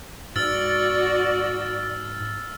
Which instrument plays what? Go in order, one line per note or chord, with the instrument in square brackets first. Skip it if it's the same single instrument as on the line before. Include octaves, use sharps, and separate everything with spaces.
[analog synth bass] G#2 [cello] F#4 D5 [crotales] E6 F6 A6